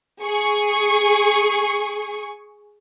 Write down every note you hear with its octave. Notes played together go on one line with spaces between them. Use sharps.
G#4 C#6